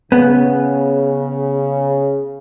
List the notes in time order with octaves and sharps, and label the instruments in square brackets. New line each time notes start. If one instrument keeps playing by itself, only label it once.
[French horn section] C#3 [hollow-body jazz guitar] B3